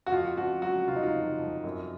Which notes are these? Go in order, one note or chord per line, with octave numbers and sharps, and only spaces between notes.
F#4
F2 F4
F2 F#4
F#3 F#4
C3 F4
D#4
F4
F2
F2
F#2